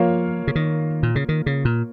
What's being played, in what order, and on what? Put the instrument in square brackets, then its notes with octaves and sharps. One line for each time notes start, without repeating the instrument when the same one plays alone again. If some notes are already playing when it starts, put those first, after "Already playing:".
Already playing: [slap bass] F3 [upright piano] A#3 F4 C#5 F5
[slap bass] C#3
D#3
A#2
C#3
D#3
C#3
A#2